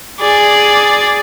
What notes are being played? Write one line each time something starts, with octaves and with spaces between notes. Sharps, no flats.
G#4 D5